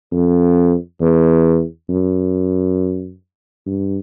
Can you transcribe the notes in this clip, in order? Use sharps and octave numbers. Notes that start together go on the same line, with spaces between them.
F2
E2
F#2
G2